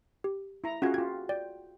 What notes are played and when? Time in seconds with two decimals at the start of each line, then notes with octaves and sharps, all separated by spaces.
0.24 G4
0.64 E4 A#5
0.82 C#4 F4 F#4 G#4 F5 G#6
0.94 F4 G4 G#6
1.29 D5 G5